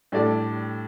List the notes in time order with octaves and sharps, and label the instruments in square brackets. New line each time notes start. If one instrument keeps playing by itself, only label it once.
[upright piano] A2 G3 D4 A4 D5